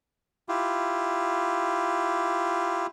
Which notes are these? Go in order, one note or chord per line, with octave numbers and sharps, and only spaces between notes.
E4 F4 G4